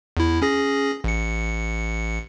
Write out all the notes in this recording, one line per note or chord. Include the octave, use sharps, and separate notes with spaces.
E2 E4
C#4 G#4 A#6
A1 C#7